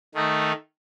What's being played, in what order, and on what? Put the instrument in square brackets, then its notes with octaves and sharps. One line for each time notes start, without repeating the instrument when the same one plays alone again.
[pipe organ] D#3 A3 D#4